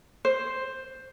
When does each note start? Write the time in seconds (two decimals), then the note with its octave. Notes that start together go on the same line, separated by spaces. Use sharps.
0.25 C5